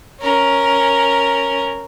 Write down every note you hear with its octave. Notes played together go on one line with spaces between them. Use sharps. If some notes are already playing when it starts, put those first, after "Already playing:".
C#4 A#4